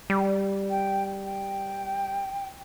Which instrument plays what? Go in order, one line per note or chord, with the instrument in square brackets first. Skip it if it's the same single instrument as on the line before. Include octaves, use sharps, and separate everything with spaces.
[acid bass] G3
[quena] G5
G5